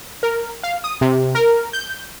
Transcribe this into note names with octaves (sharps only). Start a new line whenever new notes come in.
A#4
F5
D#6
C3
A#4
G6